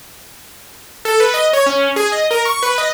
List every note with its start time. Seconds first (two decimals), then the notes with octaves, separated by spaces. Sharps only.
1.05 A4
1.20 B4
1.34 D#5
1.53 C#5
1.66 C#4
1.96 G#4
2.12 D#5
2.31 A#4
2.45 C#6
2.63 B4
2.78 D#5